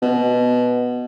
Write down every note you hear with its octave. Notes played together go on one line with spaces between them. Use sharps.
B2